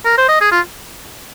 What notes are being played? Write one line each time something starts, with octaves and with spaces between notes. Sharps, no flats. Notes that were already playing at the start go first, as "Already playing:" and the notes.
A#4
C5
D#5
G#4
F4